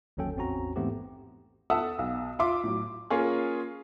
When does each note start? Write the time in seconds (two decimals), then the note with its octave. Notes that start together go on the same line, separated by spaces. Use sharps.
0.17 G1 D#2 F#3 C#4 A4 G5
0.36 A1 E2 C4 C#4 F#4 A#5
0.76 G#2 E3 A3 B3 C4 G4
1.70 A4 E5 F#5 A5 D#6 E6
1.99 B1 F5
2.39 F4 E5 C6 D6
2.64 A2 F#3
3.10 A#3 C#4 F4 G#4